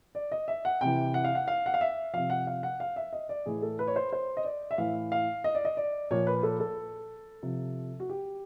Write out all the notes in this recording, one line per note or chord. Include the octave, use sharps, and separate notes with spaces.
D5
D#5
E5
F#5
C3 E3 G5
F#5
F5
F#5
F5
F#5
F5
E5
C3 F3 F5
F#5
F5
F#5
F5
E5
D#5
D5
A2 E3 G#4
A4
B4
C#5
C5
C5
D#5
D5
E5
A2 E3 F5
F5
D#5
D5
D#5
D5
A#2 F3 C#5
B4
A4
A4
C3 F3
F#4
G4